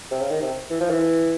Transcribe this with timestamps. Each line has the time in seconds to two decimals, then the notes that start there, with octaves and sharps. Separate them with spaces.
0.11 C3
0.21 C#3
0.30 D#3
0.41 C3
0.70 E3
0.81 F3
0.90 E3